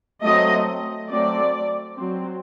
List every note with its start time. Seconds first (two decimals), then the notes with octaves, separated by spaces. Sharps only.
0.23 F#3 A3 C4 D#5
1.09 F#3 A3 C4 D5
1.96 F#3 C4